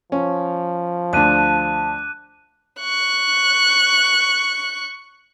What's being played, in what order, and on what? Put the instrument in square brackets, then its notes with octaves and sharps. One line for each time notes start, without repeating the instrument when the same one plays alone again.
[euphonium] F3 [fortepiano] C#4
[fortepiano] D2 D4 [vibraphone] A5 [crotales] D6 F#6 D#7
[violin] C#6 F#6